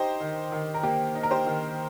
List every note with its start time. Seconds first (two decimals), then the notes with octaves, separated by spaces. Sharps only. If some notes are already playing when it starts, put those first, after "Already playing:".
Already playing: D#4 G4 C5
0.20 D#3
0.52 D#3
0.74 A#4
0.83 A#3 G4
1.15 D#4
1.23 A#4
1.31 G4 C5
1.46 D#3